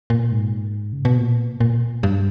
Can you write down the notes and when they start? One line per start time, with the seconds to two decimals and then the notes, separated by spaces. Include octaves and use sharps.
0.10 A#2
0.32 G#2
0.93 C#3
1.05 B2
1.18 A#2
1.60 A#2
2.03 G2